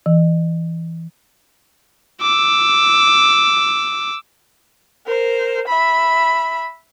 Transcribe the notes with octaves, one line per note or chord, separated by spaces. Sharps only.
E3
D6 E6
A#4 C5
E5 B5